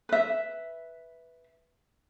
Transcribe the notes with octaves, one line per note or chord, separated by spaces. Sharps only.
B4 E5